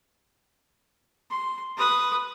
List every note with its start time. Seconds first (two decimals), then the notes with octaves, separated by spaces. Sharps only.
1.30 C6
1.77 B4 D#6